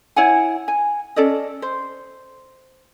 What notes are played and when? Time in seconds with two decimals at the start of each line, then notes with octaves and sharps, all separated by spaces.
0.16 E4 C#5 F#5 G#5
0.68 G#5
1.16 C#4 A4 D5 D#5
1.62 C5